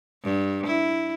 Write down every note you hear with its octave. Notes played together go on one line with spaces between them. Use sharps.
G2
E4